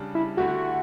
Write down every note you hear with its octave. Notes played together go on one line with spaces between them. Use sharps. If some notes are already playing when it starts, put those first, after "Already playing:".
Already playing: C#3 G3 D4
E4
D3 A3 E4 F#4 G4